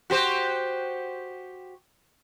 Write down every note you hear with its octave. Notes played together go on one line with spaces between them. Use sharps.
F#4 G4 C5